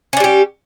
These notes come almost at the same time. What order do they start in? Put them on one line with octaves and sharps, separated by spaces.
C#4 D4 G3 G4